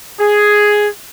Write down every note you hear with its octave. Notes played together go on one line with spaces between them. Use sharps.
G#4